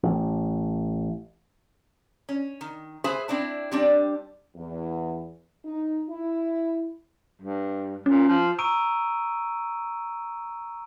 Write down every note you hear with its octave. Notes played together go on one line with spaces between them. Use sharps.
A1
C#4
D#3
G#4 B4 C5 E5 G#5
C4 D4 E4 A5
G3 C4 D4 D5
E2
D#4
E4
G2
A#2 C#4
F3
A#5 C#6 D#6 E6 D7 D#7